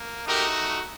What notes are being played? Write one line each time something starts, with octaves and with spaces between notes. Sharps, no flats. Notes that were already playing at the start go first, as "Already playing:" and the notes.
Already playing: A#3
A3 D#4 F#4 G4 A#4